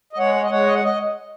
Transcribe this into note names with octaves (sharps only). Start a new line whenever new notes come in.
D#5
G#3 C#5 F#5
C#5
D#5
G#3 C#5 F#5
D#5
F#5
D#5